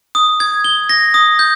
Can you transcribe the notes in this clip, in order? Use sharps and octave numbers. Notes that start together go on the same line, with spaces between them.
D#6
G#6
G7
A#6
D#6
G6